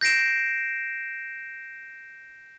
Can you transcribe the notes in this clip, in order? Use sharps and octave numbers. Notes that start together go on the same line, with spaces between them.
G6 A#6 C7 D7 E7